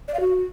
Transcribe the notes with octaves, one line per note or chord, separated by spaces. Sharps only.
D5
F5
F#4